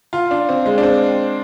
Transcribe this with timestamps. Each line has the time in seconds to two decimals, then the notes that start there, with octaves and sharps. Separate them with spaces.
0.13 F4
0.31 D4
0.49 C4
0.66 G#3
0.78 D4
0.83 C4